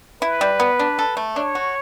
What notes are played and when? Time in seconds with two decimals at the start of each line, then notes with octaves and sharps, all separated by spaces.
0.22 E4 B4
0.41 G3
0.60 B3
0.79 D4
0.99 A4
1.17 A3
1.36 D4 C#5
1.55 F#4